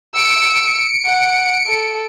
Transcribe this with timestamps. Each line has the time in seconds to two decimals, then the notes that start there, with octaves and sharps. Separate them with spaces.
0.15 E6 C#7 D7
1.06 F#5
1.67 A4